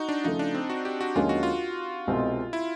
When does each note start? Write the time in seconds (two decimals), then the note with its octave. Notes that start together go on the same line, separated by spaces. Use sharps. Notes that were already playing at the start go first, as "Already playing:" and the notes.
Already playing: D#4 F#4
0.09 D4
0.24 C#3 F3 A3 D#4
0.39 D4
0.54 C4
0.70 F#4
0.85 G4
1.01 F#4
1.15 D#2 D3 F3 G#3 C#4 F4
1.29 F#4
1.43 F4
2.07 C2 B2 G#3 C4
2.53 E4